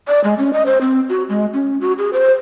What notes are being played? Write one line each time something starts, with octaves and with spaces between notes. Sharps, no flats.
D5
G#3
C#4
D#5
C5
C4
F#4
G#3
C#4
F#4
G#4
C5